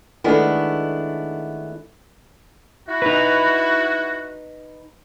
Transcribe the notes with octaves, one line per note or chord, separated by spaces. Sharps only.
D#3 G#3 A3 B3 D4 E4
E4 F#4
D#4 B4